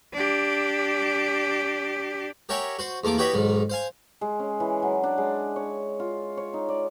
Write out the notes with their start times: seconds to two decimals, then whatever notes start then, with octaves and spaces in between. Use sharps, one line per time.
0.13 D4 G4
2.49 G4 A#4 C#5 E5 F#5 G#5
2.79 F#4 C5
3.04 E2 A3 A#3 D6
3.18 E4 F#4 G4 B4 C#5 D#5
3.34 B1 G#2 D#3
3.70 C5 F5 G#5
4.21 G#3
4.39 C#4
4.60 E3
4.82 F#3
5.03 D4
5.18 G#3
5.56 C#5
6.00 F4
6.37 C#5
6.54 D#4
6.68 D5